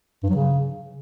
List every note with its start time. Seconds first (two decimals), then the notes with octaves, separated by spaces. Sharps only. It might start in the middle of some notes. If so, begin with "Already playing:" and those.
0.24 G2
0.30 F#3
0.36 C#3